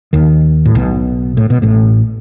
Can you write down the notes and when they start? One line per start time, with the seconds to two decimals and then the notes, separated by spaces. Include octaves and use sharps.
0.13 D#2 D#3
0.65 A2
0.75 B1 B2
1.37 A2
1.50 B2
1.62 A1 A2